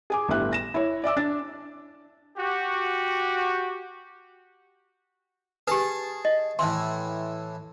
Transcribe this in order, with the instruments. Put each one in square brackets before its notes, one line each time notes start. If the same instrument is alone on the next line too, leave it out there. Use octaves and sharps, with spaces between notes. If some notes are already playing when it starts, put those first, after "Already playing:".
[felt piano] G#4 G#5 D6
G1 A2 D3 G4 E5 F#6
A#6 E7
E4 C#5
D5 E5 D6 E6
D4 A6
[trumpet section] F#4 G4
[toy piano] G4 B4 [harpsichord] G#4 A5
[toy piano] D#5
[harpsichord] A2 E3 [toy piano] C6